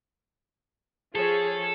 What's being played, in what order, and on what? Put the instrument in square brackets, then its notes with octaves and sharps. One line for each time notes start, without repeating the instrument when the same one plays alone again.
[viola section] F3 G#4 C#5 [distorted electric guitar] A4